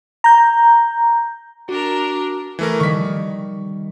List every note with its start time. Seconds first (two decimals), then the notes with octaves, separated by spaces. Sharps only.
0.24 A#5 G6
1.69 D4 F#4 A#4
2.59 E3 A3 A#4
2.80 D#3 G3 C#6 B6